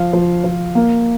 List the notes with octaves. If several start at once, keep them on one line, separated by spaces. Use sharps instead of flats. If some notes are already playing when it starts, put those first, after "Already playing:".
Already playing: F3 F5
F3
F3
A#3